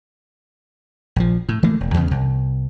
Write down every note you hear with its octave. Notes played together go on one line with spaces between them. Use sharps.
A#1 F3
A2
E3 A3 A#3
E1
E2 C#3
C2